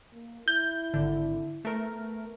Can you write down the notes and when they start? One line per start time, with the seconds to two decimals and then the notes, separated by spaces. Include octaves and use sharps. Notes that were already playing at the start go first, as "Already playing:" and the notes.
0.13 A#3
0.48 E4 G6
0.94 G#1 D3
1.65 A3 B3 A#4